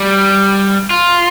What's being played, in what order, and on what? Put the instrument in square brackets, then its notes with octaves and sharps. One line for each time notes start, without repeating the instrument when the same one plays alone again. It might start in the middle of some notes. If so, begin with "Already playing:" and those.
Already playing: [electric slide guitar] G3
F4